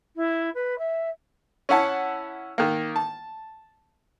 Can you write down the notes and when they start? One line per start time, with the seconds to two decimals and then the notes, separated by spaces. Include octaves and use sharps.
0.16 E4
0.54 B4
0.78 E5
1.69 C#4 E4 F#5 A5
2.58 D#3 A#3
2.96 A5